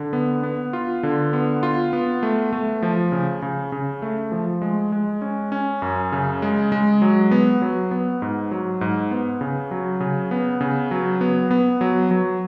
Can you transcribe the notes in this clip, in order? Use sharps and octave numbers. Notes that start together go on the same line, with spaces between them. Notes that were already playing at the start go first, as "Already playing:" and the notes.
Already playing: D3
B3
B3
F4
D3
B3
F4
B3
A3
A3
F3
C#3
C#3
C#3
A3
F3
G#3
G#3
C#4
C#4
F#2
C#3
G#3
G#3
F#3
B3
F#3
B3
G#2
F#3
G#2
B3
C#3
F#3
C#3
B3
C#3
F#3
B3
B3
F#3
F#3